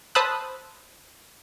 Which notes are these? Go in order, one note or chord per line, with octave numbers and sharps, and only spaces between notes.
C5 A5 B5 D#6 E6 F#6